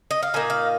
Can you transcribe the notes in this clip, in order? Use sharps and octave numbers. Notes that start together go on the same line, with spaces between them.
D#5
F5
A#2 A#3 D#4 G#5
F5